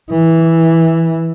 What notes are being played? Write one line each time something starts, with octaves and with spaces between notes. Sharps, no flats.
E3